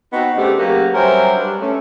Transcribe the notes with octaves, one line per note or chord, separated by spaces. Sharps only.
B3 C4 D#4 F#4
C#3 A3 C4 D4 G4
C#3 F#3 A#3 F#4 G4 B4
F#3 G3 C#4 A#4 C5 E5
G2 D4
A3 C#4